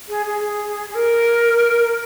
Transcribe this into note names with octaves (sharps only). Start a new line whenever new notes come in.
G#4
G#4
G#4
A#4